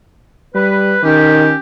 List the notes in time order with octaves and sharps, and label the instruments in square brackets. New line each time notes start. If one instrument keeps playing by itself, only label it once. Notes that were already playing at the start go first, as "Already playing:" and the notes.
[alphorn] G3 [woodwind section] B4
[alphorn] D#3 [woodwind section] C#4 G4